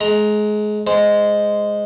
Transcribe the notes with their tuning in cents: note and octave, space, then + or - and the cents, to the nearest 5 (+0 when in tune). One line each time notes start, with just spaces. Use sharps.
G#3 +25 A#5 +0
G#3 -5 C5 -15